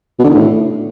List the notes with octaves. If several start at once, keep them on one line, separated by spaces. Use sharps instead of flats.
B2
D3
D#3
A2